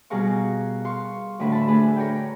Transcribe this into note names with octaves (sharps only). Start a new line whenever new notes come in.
B2 G3 G#4 A#4 F5 C#6
F5 C6 C#6
D2 A2 D3 B5
A5 B5
A3 D4 G#4 B4
A#4 C#5 D5 G5